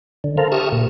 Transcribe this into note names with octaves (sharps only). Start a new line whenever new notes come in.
D3
A4 A#4 C5 F5
G4 E5 C#6 D#6 F6
A#2